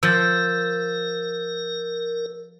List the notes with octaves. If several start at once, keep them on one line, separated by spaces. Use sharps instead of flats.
F3 A#4 E6 G6 A6